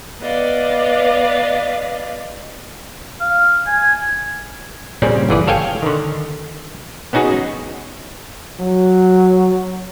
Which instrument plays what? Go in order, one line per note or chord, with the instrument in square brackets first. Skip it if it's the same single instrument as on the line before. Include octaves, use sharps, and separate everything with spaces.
[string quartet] B3 B4 D5 D#5 F5
[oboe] F5
G#5
[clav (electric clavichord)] A#2 C#3 G3 C4 C#4 D5
G1 E3 G#4 D5
A4 C#5 F5 G5 G#5
D3 D#3
B3 C#4 D#4 F#4 G#4
[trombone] F#3